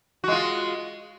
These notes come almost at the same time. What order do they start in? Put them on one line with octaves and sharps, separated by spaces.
F#4 G#3 F4